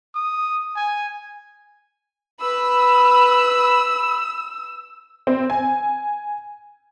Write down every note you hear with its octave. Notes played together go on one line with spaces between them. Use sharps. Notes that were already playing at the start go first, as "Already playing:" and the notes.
D#6
G#5
B4 B5 E6
C4
G#5